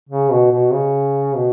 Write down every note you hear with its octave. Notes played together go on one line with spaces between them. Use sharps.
C#3
B2
B2
C#3
B2